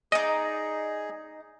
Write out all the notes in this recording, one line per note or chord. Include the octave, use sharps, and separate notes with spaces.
D#4 G#4 D5 D#5